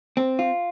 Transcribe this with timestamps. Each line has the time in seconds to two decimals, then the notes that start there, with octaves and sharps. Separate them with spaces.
0.17 C4
0.39 F4